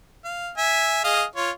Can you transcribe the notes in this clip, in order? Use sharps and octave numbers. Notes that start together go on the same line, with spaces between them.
F5
E5 G#5
G#4 D#5 F5
F4 C#5